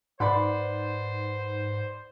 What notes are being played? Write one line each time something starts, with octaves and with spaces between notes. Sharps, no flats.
G#2 B4 C5 D5 F#5 B5 C6